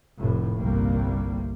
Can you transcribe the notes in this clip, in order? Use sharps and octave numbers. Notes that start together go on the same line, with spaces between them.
F1 A2
G1 C2 C3 G3 A#3